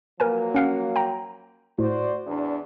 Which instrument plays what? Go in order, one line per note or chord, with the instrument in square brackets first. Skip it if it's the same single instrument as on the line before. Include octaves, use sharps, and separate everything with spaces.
[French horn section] F3 F#3 A#3 [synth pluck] A#4 B4 G#5
[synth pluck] C#4 F5 F#5
G5 A#5
[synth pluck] A2 [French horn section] F#4 C5 D5
[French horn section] E2 D4